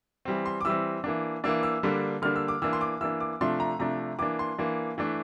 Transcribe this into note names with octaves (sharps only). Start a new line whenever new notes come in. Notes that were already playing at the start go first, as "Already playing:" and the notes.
E3 G3 C4
C6
D6
E3 G3 C4 E6
E3 A#3 D4
E3 A#3 D4 E6
E6
D3 G3 A#3 D4
D3 G3 A#3 D4 F6
E6
D6
E3 A#3 D4 E6
C6
D6
E3 A#3 D4 E6
D6
C3 F3 A3 D4 C6
A#5
C3 F3 A3 D4 A#5
E3 A#3 D4 D6
C6
E3 A#3 D4
E3 A3 D4